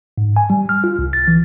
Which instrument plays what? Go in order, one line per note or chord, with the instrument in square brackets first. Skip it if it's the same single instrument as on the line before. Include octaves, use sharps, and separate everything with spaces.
[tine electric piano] G#2
G#5
G3
F6
F4
C2
A6
E3